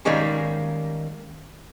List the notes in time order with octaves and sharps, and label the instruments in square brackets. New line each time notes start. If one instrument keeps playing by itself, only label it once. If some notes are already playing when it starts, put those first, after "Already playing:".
[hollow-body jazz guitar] D#3 G3 G#3 A#3 C#4